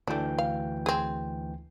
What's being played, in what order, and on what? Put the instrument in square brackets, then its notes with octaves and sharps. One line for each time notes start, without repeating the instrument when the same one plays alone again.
[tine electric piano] D2 E3 G5 [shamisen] A3 D4
[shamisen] F5
C4 G#4